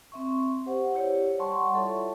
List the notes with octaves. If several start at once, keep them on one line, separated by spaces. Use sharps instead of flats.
C4 E5 C#6
G4 C5 F#5
E4 G4 C#5 D5
G3 F#5 A5 C6 C#6
E4 F4 A4 C#5 D5 E5